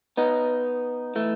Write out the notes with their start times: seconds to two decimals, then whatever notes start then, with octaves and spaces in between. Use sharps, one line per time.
0.17 B3 D#4
1.15 E3 A3